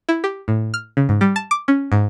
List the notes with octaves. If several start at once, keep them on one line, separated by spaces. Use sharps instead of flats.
E4
G4
A2
F6
C#3
G#2
G3
A5
D6
C#4
G#2